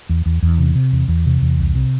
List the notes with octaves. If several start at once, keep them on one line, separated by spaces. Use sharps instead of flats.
E2
E2
E2
C3
C3
E2
E2
C3
E2
C2
C3